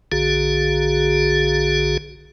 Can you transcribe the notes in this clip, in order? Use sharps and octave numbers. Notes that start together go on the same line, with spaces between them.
A#1 D3 F#4 G#4